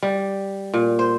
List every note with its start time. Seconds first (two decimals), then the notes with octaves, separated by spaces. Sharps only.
0.02 G3
0.74 A#2
0.99 C5